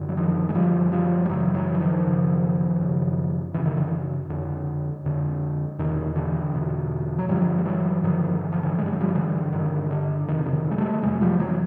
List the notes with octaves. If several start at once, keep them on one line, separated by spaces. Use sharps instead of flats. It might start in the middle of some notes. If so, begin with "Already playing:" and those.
Already playing: F#2 D3
F#3
D#3 F3
G#3
F#2 D3 F3 G3
F3 G3
G3
F#2 C#3 E3 F#3
E3 F#3
E3
D#3 F3
F#2 C#3
F#2 C#3
F#2 C#3 E3
D#3
D3 E3
F2 D3
F2 D3
E2 B2 D#3
D3 E3
E2 B2
F#3
G2 D3 F3 G3
G3
E3 F#3
G2 D3 D#3 F3
E3
F3
D3 E3
G2 D3 G3 G#3
F#3
F3 G3
D3 E3
G2 D3 D#3
D3
F2 C3 D#3
D3
D#3
G#3
G3 A3
F2 C3 F#3 G#3
F3 G3
E3 F#3